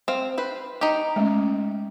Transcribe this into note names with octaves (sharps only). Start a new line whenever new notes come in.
C4 F5
B4 C5
D#4 G4
G#3 A3 C#4